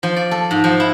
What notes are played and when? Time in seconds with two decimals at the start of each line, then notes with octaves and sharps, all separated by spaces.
0.03 F3
0.16 D5
0.31 A4
0.51 G#2
0.64 F3
0.80 E4